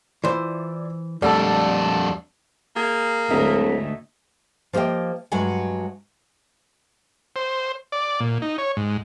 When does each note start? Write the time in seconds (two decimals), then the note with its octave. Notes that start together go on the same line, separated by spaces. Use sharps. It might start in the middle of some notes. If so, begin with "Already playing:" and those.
0.24 E3 E4 F4 C5 D5
1.22 F2 G3 A3 D4 D5 F#5 A5 E6
2.76 A#3 G#4
3.30 D1 D2 G#2 A3 D#5 E5 A#5
4.73 F3 A#3 G4 D#5 G5
5.32 G2 F#3 G#3 F#5 G#5
7.36 C5
7.92 D5
8.20 A#2
8.42 D#4
8.58 C#5
8.77 G#2